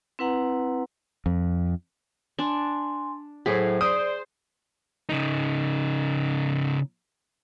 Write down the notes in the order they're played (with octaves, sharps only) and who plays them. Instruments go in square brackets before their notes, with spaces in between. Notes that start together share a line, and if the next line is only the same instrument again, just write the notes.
[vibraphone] C4 E4 B4 F#5 A#5
[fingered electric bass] F2
[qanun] D4 [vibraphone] G#5 C6
[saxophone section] A2 [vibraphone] F#3 C5 [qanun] G#4
[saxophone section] C5 [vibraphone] D5 [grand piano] D#6
[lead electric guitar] C#3 D#4